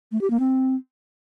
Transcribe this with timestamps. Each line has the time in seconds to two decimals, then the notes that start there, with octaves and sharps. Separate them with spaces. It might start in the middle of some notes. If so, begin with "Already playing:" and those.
0.12 A3
0.21 G4
0.30 A#3
0.40 C4